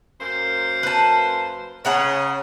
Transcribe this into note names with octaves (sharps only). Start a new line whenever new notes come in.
F#2 A#3 C5
B4 A5
C#3 C#5 F#5 A#5